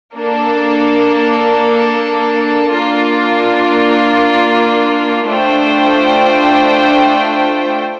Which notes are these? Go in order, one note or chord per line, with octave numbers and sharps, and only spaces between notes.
A#3 D4 A4
A#3 D4 F4
A3 D4 F4 C5 G5